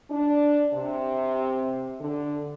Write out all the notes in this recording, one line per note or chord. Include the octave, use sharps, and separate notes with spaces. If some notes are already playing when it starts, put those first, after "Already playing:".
D4
C3
D3